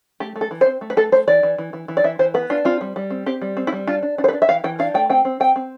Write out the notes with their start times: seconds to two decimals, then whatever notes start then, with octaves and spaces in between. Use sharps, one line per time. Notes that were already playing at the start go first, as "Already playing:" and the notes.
0.20 A3 G4
0.36 A3
0.41 A4
0.51 E3
0.61 C5
0.66 C4
0.81 A3
0.90 B4
0.97 A3 A4
1.12 A3 C5
1.27 E3 D5
1.43 E3
1.58 E3
1.73 E3
1.88 E3
1.97 D5
2.04 E3 E5
2.19 E3 C5
2.34 B3 B4
2.50 D4 F4
2.65 C4 F4
2.81 G3
2.96 G3
3.10 C4
3.26 C4 G4
3.41 G3
3.57 C4
3.67 E4
3.73 G3
3.87 D4 F4
4.03 D4
4.18 D4
4.24 C5
4.28 B4
4.33 D4
4.42 E5
4.49 E3 F5
4.64 E3 G5
4.79 D4 F5
4.94 A3 G5
5.10 C4 G5
5.25 C4
5.40 C4 G5
5.56 C4